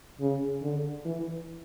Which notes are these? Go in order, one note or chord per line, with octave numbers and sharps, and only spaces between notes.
C#3
D3
E3